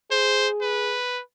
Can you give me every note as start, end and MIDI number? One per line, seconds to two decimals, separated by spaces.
0.11 0.98 68
0.11 0.48 72
0.62 1.21 71